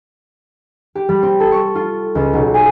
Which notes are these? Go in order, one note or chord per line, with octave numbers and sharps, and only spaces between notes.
G4
G3
C4
A4
C#6
F4
C#2
B1
G#5